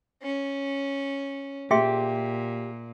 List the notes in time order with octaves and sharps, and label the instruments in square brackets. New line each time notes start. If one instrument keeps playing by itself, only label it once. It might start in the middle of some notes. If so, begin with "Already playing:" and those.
[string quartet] C#4
[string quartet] A#2 [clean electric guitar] G4 [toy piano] G#4 E5 C6